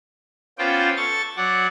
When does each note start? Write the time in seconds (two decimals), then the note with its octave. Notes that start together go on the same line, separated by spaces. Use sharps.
0.58 B3 C#4 F4 C5 D5 G5
0.97 A4 C#6 A6
1.37 F#3 D5 F#5